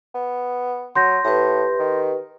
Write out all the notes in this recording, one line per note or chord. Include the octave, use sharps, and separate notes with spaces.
B3
F#3 C6 G6 A#6
A2 G4 B4
D#3